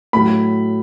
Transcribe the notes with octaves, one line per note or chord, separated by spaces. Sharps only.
A2 F#3 B5